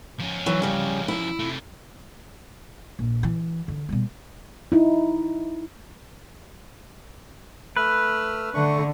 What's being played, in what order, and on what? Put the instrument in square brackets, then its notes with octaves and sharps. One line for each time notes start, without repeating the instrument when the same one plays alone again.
[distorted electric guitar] F3 C#4
[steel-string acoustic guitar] E3 F#3
C#3 G3
E4
[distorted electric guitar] C3 A3
[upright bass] A#1
E3
D3
B2 G3
[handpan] D#4 E4
[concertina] A3 E6 F6 [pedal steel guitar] B4
[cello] D3 [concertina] A3 C#6